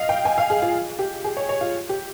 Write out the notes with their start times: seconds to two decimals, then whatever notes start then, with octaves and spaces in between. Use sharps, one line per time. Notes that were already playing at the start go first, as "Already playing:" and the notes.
Already playing: D#5 F5
0.09 G5
0.25 G#5
0.38 F5
0.50 G#4
0.62 F4
0.99 G4
1.24 G#4
1.37 C#5
1.49 C#5
1.61 F4
1.89 G4